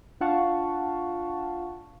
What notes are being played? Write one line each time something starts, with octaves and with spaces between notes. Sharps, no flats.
D4 F4 F5 F#5 A5 C#6